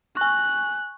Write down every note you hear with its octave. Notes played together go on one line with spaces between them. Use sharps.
G#5 C#6 F#6